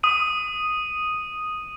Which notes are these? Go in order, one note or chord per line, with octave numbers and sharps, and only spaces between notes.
D#6 D#7